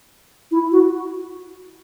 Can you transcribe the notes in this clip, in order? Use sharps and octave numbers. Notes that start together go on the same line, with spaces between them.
E4
F#4